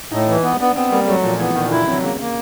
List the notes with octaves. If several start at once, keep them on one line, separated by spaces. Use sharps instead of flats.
A2 D#4
E3
B3
B3 D4
B3 C4
G3 A#3
F#3 A3
A#2 F3
E3 B3
A#2 D#3
D3 E4
C3 F#3
C#3 A#3
A#3